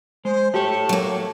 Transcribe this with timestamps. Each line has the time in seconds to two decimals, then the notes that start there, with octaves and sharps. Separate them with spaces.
0.25 G#3 C5
0.54 A3 G4 C#5 A5
0.89 F#3 A#3